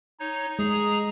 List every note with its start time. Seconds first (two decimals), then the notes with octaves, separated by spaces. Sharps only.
0.20 D#4 C#5
0.59 G#3 G#4 A#5 D#6